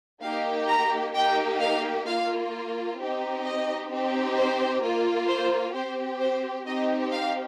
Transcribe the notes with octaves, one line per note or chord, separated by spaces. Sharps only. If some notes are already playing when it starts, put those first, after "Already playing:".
A#3 D#4 G4 F5
A#5
A#3 D#4 G4 G5
F5
A#3 F4 F5
C4 D#4 G4
D#5
C4 D#4 G4
C5
A#3 F4
C5
C4 G4 C5
C5
C4 D#4 G4 D#5
F5